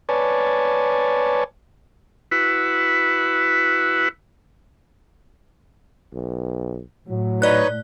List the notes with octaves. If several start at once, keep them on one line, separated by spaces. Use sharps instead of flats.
B4 C#5 D5 G#5 A5
E4 F#4 B4
B1
A2 F#3
D#4 B4 C#5 D5 F#6